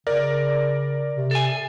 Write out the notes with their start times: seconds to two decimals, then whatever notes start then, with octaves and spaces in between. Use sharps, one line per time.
0.07 C#3 A#4 D5
1.15 C3
1.31 A4 G#5